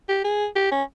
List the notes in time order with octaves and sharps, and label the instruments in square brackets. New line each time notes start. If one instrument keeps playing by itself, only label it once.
[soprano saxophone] G4
G#4
G4
C#4